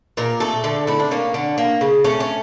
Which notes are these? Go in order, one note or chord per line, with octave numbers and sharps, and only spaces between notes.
A#2 A#4
A3 A4
D3 A4
A3 E4
D4
A#3 C#4
D3
A#3
C#3
A3 C#4
C#4